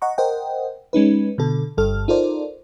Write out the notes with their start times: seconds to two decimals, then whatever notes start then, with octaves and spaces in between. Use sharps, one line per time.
0.02 D#5 F#5 A#5 C#6
0.18 A#4 C5 D#5 F#5 G5
0.93 G#3 C#4 D#4 B4
1.38 B2 D3 A4
1.77 G1 G2 A4 F6
2.08 D#4 F4 A4 A#4 C5 D5